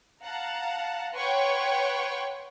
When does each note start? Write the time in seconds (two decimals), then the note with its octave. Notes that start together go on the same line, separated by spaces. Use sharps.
0.24 F5 F#5 A5 A#5
1.14 B4 C#5 F#5 G5 C6 C#6